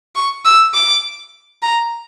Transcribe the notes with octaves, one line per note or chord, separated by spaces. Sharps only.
C#6
E6
D6
A#5